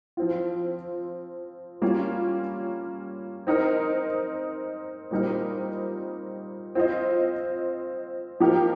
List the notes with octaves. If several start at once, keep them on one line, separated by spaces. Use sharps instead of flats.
F3 C4 F4
G3 A#3 C#4 F4
C4 D#4 A#4 D#5
A#2 G3 C4 D#4 A#4
C4 F4 C5 D#5
F3 A#3 D#4 G4 A#4